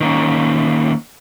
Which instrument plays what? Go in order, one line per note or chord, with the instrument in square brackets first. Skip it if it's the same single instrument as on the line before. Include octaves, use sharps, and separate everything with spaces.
[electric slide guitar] D#3 A#3 C#4